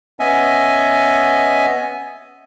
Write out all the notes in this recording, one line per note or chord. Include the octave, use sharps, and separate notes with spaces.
B3 C#4 D#5 E5 G#5